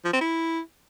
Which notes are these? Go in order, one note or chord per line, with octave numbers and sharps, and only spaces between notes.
F3
C4
E4